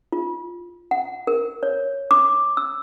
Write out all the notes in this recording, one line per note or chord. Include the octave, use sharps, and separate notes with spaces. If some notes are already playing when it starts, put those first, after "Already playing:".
F4
F#5
A#4
C#5
D6
E6